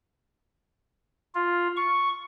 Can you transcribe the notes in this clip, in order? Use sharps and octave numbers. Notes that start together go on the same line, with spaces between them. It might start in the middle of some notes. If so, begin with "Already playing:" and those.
F4
C#6